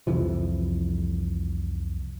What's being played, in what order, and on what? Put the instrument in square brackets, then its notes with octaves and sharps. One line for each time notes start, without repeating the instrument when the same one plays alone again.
[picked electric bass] C2 F2 E3 F3